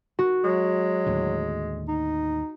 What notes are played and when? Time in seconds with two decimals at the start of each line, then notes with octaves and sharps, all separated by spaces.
0.19 F#4
0.44 F#3 G#3
1.07 D#2 A2 D3
1.88 D#4